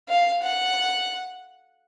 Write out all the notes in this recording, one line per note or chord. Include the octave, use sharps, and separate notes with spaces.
F5
F#5